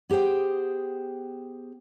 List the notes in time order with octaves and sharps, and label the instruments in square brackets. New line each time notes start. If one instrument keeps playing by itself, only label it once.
[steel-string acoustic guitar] B3 G4 G#4 C5 G5